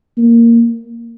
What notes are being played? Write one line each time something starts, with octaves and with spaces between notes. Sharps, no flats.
A#3